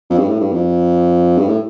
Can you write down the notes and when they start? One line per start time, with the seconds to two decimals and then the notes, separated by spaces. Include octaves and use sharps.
0.10 F2
0.19 G2
0.28 A2
0.41 G2
0.53 F2
1.38 G2
1.48 A2